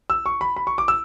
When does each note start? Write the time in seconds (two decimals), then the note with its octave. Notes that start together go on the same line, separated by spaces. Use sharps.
0.10 E6
0.26 C#6
0.41 B5
0.56 B5
0.67 C#6
0.78 D6
0.88 E6